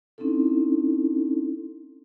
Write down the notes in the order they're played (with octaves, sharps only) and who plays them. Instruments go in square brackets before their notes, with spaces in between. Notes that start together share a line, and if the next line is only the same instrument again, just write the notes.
[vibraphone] C4 C#4 D#4 E4 A4